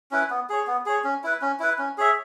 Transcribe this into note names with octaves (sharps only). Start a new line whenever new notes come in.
C#4 E4 B4
B3
G#4 C#5
B3
G#4 C#5
C#4
E4 B4
C#4
E4 B4
C#4
G#4 C#5 E5